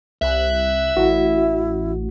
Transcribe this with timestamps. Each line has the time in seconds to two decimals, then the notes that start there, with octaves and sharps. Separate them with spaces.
0.22 C2 E5 F#6
0.97 A1 E4 F#4